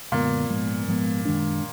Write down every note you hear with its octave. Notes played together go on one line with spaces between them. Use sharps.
F#2 A#2 D3 G#3 B3
G#2 F3 G#3 B3
G#2 F3 G#3 B3
F#2 D#3 G#3 D4